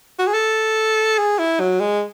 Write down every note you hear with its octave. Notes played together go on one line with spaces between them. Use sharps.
F#4
G#4
A4
G#4
E4
F#3
G#3